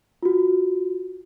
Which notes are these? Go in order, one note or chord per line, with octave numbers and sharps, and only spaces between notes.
F4 F#4